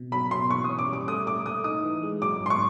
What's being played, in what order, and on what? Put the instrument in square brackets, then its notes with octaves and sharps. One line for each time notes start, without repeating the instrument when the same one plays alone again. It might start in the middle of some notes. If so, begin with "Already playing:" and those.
Already playing: [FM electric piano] B2
[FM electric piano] F#3 [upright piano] B5
[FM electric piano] B2 [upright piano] C6
[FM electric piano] E3 [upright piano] C#6
[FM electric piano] C#4 [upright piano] D#6
[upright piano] D6
[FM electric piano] G3
[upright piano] D6
[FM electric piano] A3 [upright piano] D#6
[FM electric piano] A3 [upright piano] D6
[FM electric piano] A3 [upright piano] D#6
[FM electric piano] D#4 [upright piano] D#6
[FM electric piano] E3
G#3
[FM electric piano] F#3 [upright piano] D6
[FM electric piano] G#2
[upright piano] C6
C#6